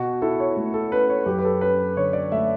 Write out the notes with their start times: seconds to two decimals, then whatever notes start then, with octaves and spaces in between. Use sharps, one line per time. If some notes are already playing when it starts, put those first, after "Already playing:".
Already playing: B2 F#4
0.22 E4 A4
0.40 C#5
0.57 A3
0.74 A4
0.92 C#4 B4
1.10 C#5
1.26 F#2 G4
1.38 B4
1.45 A4
1.61 C#4 B4
1.97 D3 C#5
2.13 D5
2.32 A3 E5